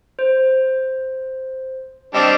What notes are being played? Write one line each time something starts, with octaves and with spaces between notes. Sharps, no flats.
C5
G3 C4 D4 D#5